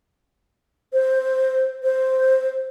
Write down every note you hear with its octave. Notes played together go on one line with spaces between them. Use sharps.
C5
C5